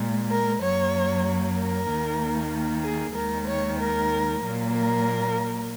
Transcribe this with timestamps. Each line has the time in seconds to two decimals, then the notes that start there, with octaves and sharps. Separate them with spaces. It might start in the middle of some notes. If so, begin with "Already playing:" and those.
Already playing: A#2 G#3
0.31 A#4
0.62 F#2 F#3 A#3 C#5
1.58 A#4
1.90 D#2 D#3 A#3
2.84 G#4
3.15 D#2 D#3 G#3 A#4
3.48 C#5
3.79 A#4
4.43 A#2 F#3 A#3
4.73 A#4